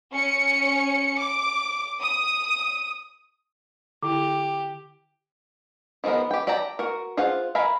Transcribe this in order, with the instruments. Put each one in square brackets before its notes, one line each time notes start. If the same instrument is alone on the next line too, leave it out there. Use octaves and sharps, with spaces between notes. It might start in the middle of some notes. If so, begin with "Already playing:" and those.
[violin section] C#4 C#7
D6
D#6
[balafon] D3 E4 [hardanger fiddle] G4 [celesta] D6
[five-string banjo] D#3 F3 G#3 B3 A#4
G4 G5
G4 D5 G5 A5 A#5
F#4 A#4
F4 G#4 C5 F5 F#5
A#4 F5 G#5 A#5 B5